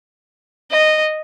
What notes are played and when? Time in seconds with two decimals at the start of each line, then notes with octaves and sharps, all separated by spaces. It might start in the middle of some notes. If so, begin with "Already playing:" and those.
0.71 D#5